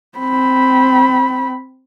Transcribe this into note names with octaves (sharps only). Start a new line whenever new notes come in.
C4 B5